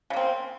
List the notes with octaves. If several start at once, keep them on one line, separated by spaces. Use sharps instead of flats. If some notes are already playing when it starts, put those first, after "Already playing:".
C#3 A#3 C4